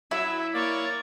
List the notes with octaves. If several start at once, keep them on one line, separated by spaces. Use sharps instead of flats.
F#3 E4 E5
A#3 C#5 D5